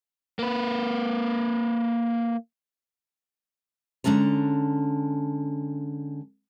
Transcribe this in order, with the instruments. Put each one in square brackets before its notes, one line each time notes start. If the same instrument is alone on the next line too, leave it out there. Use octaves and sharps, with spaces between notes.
[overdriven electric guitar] A#3 B4
[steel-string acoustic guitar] D3 G#3 C#4 A5 A#5